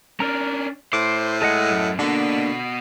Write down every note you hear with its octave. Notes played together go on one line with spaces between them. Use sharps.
C#4 D4 A#4 A#5
A2 C5 D6
G#3 G#4 A4 D#5 F#5
F#2
D3 A#3 B3 D4 F#4